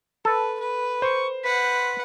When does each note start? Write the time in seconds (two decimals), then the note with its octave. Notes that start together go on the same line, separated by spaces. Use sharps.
0.25 A4 B4
0.60 B4
1.02 C5 C#6
1.44 B4 F#5 B6